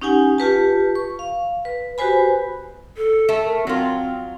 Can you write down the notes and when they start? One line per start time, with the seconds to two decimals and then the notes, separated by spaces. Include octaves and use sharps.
0.01 C#4 D#4 G4 F#5 G#5
0.38 F4 G4 B4 A5
0.95 C#6
1.19 F5
1.65 B4
1.98 F#4 G4 B4 C5 G#5 B5
2.97 A4
3.29 A3
3.43 A#4
3.67 F#3 C4 F4